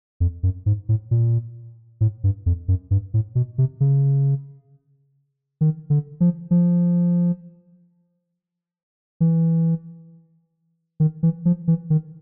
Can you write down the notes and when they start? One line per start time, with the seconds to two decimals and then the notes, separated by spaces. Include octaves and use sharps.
0.20 F2
0.43 F#2
0.66 G#2
0.89 A2
1.11 A#2
2.01 A2
2.24 G2
2.46 F2
2.68 F#2
2.91 G2
3.14 A2
3.35 B2
3.58 C3
3.80 C#3
5.61 D#3
5.90 D3
6.20 F3
6.51 F3
9.20 E3
11.00 D#3
11.23 E3
11.45 F3
11.68 E3
11.90 D#3